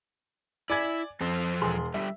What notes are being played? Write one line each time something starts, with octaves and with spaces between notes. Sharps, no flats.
E4 D5 G#5 G#6
F2 F3 A4 C5
E1 G#4 C6
D3 G3 E5